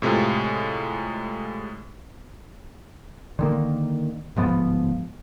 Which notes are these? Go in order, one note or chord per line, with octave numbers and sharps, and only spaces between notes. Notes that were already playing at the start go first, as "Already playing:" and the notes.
A2 C3 G#3 F4
D3 D#3 A#3
D1 G#2 F3 B3